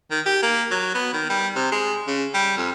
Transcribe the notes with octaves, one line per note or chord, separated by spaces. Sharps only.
D#3
G4
A#3
F#3
B3
D#3
G3
C3
G#3
C#3
G3
F2